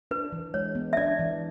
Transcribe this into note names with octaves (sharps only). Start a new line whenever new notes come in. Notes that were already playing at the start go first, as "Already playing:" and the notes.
D4 B4
E3
G#3 C#5
B3
E5
D4 D5
E3